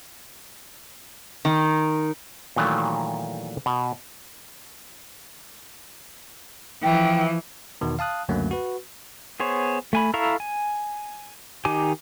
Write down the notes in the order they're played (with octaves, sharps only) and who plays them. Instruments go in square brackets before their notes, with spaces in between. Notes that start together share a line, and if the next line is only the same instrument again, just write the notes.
[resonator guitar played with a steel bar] D#3
[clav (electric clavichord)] A#2 D#3 E3 F#3 A3
B2
[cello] E3 F3 [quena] G5
[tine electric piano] E2 B2 D#3
F5 A5 D#6 F#6
C#2 F#2 D3 F#3 A3 A#3
F#4 B4
[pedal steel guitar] B3 G#4 C5 C#5
A3 G#5 B5
E4 A4 F5 A#5 C#6
G#5
D#3 D#4 G4 G#5 D6